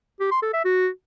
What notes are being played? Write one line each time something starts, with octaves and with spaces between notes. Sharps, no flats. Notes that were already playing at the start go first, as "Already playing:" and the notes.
G4
C6
A4
E5
F#4